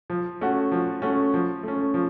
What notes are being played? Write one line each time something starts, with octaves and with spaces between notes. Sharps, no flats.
F3
A3 C#4 F#4
F3
A3 C#4 F#4
F3
A3 C#4
F3